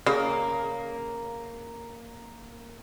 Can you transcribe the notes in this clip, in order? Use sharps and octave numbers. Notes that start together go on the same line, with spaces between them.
C#3 A#3